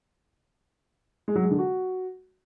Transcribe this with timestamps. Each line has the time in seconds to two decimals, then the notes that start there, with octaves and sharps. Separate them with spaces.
1.28 G#3
1.36 F#3
1.43 G#3
1.51 D3
1.59 F#4